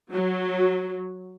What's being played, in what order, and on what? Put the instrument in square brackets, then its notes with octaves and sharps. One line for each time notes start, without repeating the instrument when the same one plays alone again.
[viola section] F#3